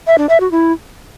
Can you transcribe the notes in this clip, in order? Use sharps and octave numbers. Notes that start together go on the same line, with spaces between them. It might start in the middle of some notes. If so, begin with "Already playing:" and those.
E5
D4
E5
F#4
E4